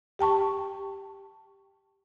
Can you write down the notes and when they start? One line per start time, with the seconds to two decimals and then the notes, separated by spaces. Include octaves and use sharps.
0.19 G4 G5 A5 C#6